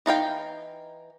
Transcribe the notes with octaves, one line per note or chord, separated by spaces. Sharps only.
E3 D#4 F5 G5